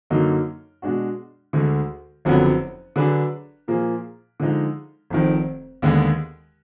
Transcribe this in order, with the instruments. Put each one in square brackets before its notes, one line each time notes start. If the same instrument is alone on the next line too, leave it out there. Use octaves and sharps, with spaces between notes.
[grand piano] F#2 D3 F#3 A#3 D#4
B2 G#3 D4 F#4
D2 D3 G#3
F#1 F2 D3 F#3 B3
D3 F#3 D4 G#4 B4
A#2 F3 A#3 F4 G#4
D3 F3 G#3 D#4
F1 F2 D#3
D#2 D3 G#3 B3